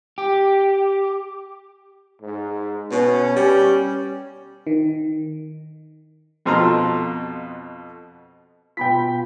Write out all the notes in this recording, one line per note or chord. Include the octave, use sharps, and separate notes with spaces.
G4
G#2
B2 C#4
G3
D#3
F2 B2 C4 F4 A4 A#5
B2 B3 F4 G5 B5 B6